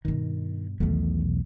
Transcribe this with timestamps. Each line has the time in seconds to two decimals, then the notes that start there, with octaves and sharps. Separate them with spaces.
0.05 G2 B2 D#3
0.80 B1 E2 B2 D#3 A3